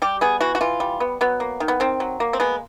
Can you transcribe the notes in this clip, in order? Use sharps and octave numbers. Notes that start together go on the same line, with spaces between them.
G3 G4
B3 G#4
E3 F#4
F#4
E3 F4
G3
B3
F#3 B3
A#3
D#3
B3
D#3 C4
F#3
A#3
C4
G#3 B3